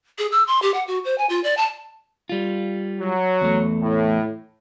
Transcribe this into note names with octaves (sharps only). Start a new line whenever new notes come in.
G#4
E6
C6
G4
F#5
F#4
C5
G#5
F4
D5
A5
G3 F4
F#3
E2 A3
A2